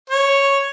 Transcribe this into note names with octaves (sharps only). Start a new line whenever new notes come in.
C#5